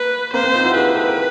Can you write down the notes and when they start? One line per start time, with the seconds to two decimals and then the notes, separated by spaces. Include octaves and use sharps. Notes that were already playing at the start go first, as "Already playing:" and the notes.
Already playing: A#3 B4
0.33 A#3 C4 C5
0.44 A#3 C4
0.54 D#4 F4
0.64 E4 F#4
0.71 G4
0.75 F#4 G#4 B4
0.95 G4 A4
1.08 A#4